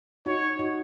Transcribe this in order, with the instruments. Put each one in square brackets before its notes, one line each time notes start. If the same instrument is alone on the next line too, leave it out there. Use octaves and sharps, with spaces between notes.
[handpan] D#4 F#4 [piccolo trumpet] C#5
[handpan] D#4 F#4